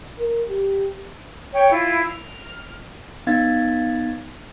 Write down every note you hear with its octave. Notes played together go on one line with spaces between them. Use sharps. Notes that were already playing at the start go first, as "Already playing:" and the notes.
A#4
G4
C#5 G5
E4 F4
F6
B3 D#4 F5 G#6 A6